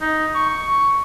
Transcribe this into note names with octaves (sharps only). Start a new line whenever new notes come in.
D#4
C#6